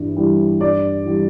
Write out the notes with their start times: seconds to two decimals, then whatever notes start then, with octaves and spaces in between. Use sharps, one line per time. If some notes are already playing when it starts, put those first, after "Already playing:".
Already playing: G2 E3 G3
0.16 E3 G3
0.60 G2 D5
1.05 E3 G3